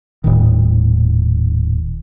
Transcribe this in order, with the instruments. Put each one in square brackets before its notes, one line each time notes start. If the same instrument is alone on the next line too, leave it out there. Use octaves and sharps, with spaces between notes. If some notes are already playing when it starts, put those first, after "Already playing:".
[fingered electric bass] D#1 A2 D#3